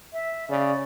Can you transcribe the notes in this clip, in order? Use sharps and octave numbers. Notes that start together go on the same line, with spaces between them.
E5
C#3 D5